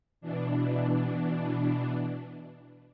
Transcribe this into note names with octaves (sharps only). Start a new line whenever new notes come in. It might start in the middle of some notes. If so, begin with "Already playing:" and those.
B2 E3 D4